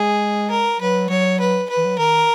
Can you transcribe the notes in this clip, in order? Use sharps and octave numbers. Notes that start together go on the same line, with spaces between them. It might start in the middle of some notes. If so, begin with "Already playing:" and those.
Already playing: G#3 G#4
A#4
F#3 B4
F#3 C#5
B4
B4
E3
F#3
D#3 A#4